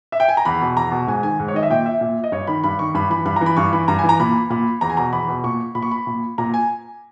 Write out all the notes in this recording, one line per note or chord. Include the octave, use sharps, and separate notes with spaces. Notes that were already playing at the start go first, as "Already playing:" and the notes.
E5
G5
G#5
A#5
E2 B5
B2
E2 A#5
B2
G#2 G#5
D#3 G#5
G#2
C#5
D#3 D#5
E5
A#2 G5
E5
A#2
D#5
G2 C#5
D#3 B5
G2 B5
D#3 C#6
G2 B5
E3 B5
G2 B5
A#5
E3
B5
G2 C#6
E3 B5
G2 A#5
G#5
E3
A#5
A#2 B5
A#2 B5
E2 A#5
G#5
B2 A#5
E2 B5
B2
A#2 C#6
A#2 B5
C#6
B5
A#2
A#2 A#5
G#5